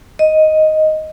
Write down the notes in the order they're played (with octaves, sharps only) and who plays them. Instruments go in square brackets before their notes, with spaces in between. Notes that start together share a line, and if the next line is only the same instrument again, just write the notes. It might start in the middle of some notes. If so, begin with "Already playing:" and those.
[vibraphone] D#5